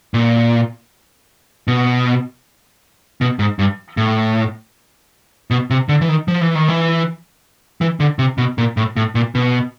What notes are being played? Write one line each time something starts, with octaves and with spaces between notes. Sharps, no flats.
A#2
B2
B2
G#2
G2
A2
B2
C3
D3
E3
D#3
F3
E3
D#3
E3
E3
D3
C3
B2
A#2
A2
A2
A#2
B2